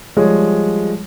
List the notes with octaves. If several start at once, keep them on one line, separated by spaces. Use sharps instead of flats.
F3 G3 G#3 C#5